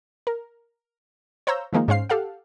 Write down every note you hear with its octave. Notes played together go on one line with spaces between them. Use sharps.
A#4
C5 C#5 F5 A#5 E6 G6
D#3 F3 G#3 A#3 D#4
G#2 C#4 C5 F5 C7
G4 A4 F5 F#5